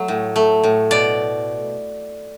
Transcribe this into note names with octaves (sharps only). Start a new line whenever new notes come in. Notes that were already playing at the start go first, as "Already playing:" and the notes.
Already playing: F#3 A3
A2
A3
A2
B2 D5